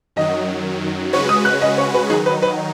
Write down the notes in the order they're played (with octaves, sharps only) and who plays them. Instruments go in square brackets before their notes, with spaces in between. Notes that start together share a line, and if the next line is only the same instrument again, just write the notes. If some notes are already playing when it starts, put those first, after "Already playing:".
[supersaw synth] F#2 D#3 F#3 [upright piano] D#5
[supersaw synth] C#3 G#3 C#4 F#4 B4 [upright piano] C#5
[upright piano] D#6
F#6
D#5
C#5
B4
[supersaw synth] D#3 F#3 D#4 [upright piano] G#4
[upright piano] B4
B4